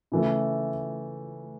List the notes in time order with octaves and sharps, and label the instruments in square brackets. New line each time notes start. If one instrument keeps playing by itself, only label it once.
[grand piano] C#3 E3 A3